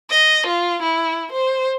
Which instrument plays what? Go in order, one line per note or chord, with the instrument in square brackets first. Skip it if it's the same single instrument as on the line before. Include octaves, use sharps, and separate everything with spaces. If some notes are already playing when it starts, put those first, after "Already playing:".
[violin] D#5
F4
E4
C5